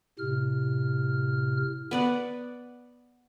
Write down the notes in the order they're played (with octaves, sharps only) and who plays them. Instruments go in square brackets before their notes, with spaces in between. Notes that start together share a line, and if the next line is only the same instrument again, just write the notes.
[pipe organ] A2 C3 F6
[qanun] B3 D5 F#5